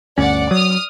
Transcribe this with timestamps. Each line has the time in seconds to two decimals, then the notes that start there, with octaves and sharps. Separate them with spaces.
0.18 G1 D2 C#4 D5 F#5
0.51 F#3 D#6 F6